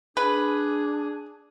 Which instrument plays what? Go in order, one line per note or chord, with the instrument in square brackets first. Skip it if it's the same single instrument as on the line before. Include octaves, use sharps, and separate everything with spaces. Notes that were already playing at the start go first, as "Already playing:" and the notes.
[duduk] D4 [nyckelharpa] G#4 [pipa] B4